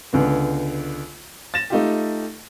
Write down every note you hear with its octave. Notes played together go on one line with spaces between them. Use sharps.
C#2 D3 B3
A6 A#6 E7
A3 D#4 F4 G4